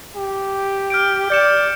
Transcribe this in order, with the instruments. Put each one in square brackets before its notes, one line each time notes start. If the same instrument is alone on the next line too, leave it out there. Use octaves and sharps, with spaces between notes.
[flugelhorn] G4
[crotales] F6 G6 D7
[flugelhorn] D5 [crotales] G6 C#7 E7